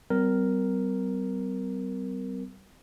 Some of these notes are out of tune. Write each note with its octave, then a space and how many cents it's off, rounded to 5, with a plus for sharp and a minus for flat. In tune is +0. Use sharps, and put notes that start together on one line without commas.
G3 -30 C4 -40 A#4 +0